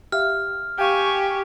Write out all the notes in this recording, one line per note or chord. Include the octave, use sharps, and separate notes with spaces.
G4 E5 F5 F6
G4 F5 G5 G#5 C#6